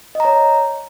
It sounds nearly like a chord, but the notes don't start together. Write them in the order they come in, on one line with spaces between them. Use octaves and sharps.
D#5 A#5 C#5